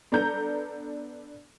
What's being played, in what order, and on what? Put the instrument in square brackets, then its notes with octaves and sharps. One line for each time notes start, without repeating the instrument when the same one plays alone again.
[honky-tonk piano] B3 D4 A4 A#5 G6